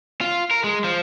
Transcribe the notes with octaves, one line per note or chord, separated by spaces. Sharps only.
F4
A#4
G#3
F3